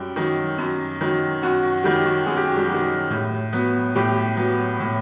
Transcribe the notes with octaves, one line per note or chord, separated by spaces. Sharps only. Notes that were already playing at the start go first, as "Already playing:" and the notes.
Already playing: F#2 G3 G4
D#3 F#3
F#2
D#3 F#3
F#2 F#4
F#4
D#3 F#3 G3 G4
F#4
F#2 G#4
G4
F#4
G3 G4
D#3 F#3
A2
F#3 B3
A2 G3 G4
F#3 B3
A2